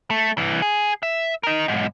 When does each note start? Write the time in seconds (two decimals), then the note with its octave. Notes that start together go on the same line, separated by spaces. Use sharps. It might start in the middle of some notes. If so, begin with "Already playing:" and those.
0.10 A3
0.38 C2 E3
0.62 G#4
1.03 E5
1.43 A#4 D#5
1.68 B1 G#2